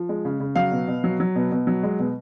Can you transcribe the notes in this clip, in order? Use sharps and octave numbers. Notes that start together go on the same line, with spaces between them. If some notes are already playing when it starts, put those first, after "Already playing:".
Already playing: F3
G#3
C#3
C#3
F#3 F5
B2
B2
F#3
F#3
B2
B2
F#3
G#3
B2